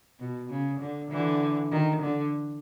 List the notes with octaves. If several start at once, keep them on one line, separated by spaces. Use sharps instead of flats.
B2
C#3
D3
D3 E3
D#3
D3